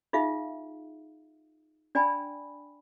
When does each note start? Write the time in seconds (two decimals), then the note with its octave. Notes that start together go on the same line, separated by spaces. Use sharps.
0.13 D#4 F4 G#4 E5 F5
1.95 D4 D5 G5 G#5 B5